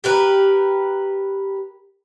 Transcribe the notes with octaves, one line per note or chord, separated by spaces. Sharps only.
G4 A#4 B4